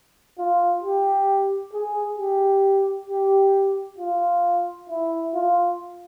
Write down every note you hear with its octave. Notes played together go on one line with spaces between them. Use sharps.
F4
G4
G#4
G4
G4
F4
E4
F4